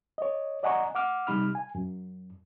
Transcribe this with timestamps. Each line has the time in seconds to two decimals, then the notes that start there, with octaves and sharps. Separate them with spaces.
0.18 C#5 D#5
0.63 D5 D#5 F#5 G#5 A#5 C#6
0.95 F#5 D6 F6
1.27 C3 G3 D#4 B5 F6
1.55 G#5
1.75 F#2